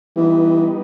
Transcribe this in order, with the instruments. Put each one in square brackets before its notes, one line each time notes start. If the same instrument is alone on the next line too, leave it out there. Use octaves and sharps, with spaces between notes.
[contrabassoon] E3 [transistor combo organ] G3 B3 D#4